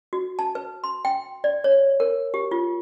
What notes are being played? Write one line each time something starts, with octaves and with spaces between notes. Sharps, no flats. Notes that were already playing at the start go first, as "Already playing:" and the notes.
F#4
A5
B4
C6
G5
D5
C#5
A#4
G4
F4